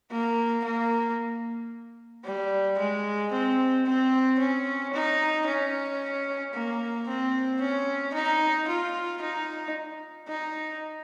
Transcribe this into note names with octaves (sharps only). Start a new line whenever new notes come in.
A#3
A#3
G3
G#3
C4
C4
C#4
D#4
C#4
A#3
C4
C#4
D#4
F4
D#4
D#4